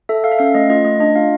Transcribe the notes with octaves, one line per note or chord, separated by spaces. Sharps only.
A4 E5
A4 F5
E5
C#4 F5
A3 D#5
F4 D#5
A3 D#5
D4 D#5
F4 F5